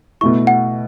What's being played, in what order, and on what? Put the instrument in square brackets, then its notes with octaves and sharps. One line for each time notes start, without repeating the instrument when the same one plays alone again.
[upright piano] B2 A3 E4 [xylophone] C#6
[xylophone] F#5